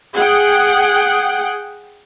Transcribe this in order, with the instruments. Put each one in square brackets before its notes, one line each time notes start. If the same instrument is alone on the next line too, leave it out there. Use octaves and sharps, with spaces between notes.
[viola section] G#4 F#5 G5